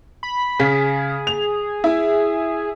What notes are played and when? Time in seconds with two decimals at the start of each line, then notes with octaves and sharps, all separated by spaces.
0.23 B5
0.59 C#3 G#4 B6
1.27 F7
1.84 E4